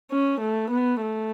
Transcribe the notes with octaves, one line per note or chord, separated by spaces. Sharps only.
C#4
A3
B3
A3